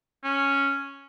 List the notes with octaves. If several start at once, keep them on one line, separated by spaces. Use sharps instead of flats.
C#4